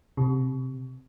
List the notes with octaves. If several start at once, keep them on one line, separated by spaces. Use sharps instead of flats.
C3